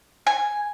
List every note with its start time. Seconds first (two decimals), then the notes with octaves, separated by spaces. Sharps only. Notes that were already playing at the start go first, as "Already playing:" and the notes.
0.27 G#5